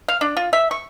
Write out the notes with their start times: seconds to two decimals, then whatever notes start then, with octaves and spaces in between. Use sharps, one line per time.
0.08 F5
0.21 D4
0.37 F4
0.53 E5
0.71 C#6